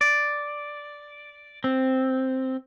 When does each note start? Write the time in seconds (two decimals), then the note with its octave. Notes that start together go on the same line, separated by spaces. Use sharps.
0.01 D5
1.64 C4